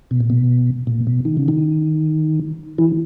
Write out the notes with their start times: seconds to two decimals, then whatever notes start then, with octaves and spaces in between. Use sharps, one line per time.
0.11 B2
0.20 A#2
0.30 B2
0.87 A#2
1.07 B2
1.25 D#3
1.37 C#3
1.48 D#3
2.78 E3